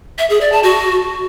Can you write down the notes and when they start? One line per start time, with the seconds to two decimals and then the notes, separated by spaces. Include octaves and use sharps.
0.19 E5
0.30 G#4
0.41 D5
0.52 A5
0.63 F#4